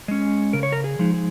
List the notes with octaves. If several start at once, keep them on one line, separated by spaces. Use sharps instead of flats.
G#3 C#4
C#3 A#4
C#5
A#4
G#4
F3 G#3 D#4
G#4